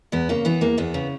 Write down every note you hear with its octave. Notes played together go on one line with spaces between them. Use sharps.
E2 B3
C#3 A#3
E3 B3
E2 A#3
E2 B3
C#3